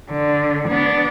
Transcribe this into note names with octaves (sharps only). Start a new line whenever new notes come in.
D3
B3 D4